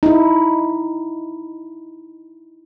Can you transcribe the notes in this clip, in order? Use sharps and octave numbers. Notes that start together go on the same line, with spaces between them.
D#4 E4